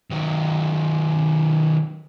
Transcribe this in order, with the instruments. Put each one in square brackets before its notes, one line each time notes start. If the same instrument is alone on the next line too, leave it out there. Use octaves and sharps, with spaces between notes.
[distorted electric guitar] D#3 F#3